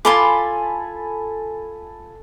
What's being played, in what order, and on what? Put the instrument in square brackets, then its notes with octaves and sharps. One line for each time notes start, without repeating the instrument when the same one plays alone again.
[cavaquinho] F4 C6 D6 [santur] A4 G#5 B5